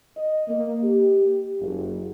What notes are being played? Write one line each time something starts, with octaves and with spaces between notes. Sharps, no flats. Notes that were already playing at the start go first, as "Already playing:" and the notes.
D#5
A#3
G4
F#1